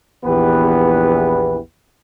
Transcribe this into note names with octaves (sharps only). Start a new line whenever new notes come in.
A#1 E2 E3 B3 G4 B4